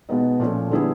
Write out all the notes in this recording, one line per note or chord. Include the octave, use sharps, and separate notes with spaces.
B2 G#3 B3 D#4
A#2 F3 A3 C#4
D3 G3 B3 E4 G#4